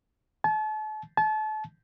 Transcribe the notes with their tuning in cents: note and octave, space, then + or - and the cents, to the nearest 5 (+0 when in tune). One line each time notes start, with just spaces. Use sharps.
A5 -35
A5 -30